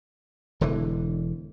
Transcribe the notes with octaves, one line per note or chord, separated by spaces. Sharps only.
E1 D3 E3